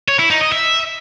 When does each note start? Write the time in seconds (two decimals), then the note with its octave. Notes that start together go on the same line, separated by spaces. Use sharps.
0.08 C#5
0.19 E4
0.30 D#4
0.41 D#5
0.52 E5